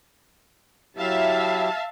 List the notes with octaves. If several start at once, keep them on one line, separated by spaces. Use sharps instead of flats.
F#3 E4 G4 E5 F5 A5